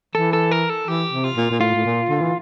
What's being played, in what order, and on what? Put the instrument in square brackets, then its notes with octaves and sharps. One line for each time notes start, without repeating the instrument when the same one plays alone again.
[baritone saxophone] E3 [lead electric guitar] A4
[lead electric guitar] A4
A#4
A4
[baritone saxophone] E3 [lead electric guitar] G4
[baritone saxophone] C3
[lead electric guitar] F4
[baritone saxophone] A#2
A#2
[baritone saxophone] A2 [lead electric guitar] F4
[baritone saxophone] A2
A#2
D3
E3